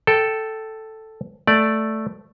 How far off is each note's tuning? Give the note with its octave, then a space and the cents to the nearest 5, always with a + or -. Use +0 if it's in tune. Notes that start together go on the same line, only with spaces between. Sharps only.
A4 +0 G5 -10
A3 +0 D5 +0